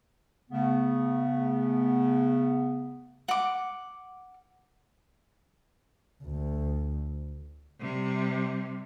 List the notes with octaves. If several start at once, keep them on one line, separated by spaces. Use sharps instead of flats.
C#3 A3 B3
F#5 D6
D2
C3 G3